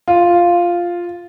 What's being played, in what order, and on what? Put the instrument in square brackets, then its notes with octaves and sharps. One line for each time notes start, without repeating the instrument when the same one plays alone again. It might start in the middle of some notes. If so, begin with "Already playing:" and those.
[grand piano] F4